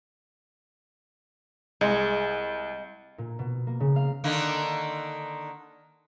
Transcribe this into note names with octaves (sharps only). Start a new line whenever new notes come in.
C2 G#3
A#2
B2
A#3
C#3
F5
D3 D#3 A#3